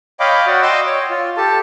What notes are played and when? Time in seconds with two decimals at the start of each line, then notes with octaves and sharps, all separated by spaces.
0.20 C#5 D#5 F5 G5 B5 D6
0.47 F#4 D5 F#5 G5
0.62 D#5 G5 C6 D6 E6
0.87 C#5
1.10 F4
1.37 G4 A4 A5